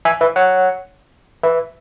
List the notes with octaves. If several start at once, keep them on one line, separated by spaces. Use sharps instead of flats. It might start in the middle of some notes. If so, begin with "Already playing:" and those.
E5 G#5
B4 E5
C#5 F#5
B4 E5